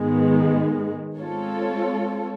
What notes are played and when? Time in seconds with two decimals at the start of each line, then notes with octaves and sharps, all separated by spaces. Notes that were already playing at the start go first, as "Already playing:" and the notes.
Already playing: G#2 D#3 G#3 B3
1.19 G#3 C4 F4 A4 C#5